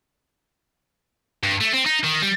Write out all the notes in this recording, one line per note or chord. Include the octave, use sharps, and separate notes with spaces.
G2
A3
C4
D#4
D#3
G3